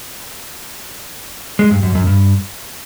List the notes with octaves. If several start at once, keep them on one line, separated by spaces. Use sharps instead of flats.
G#3
G2
F#2
F#2
G2